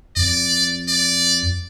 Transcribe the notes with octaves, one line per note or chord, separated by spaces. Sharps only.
F2 D5
D5